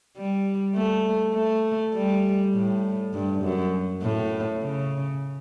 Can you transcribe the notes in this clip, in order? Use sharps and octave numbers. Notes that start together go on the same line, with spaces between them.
G3
A3
A3
G3
A2
G2
F#2
A2
C#3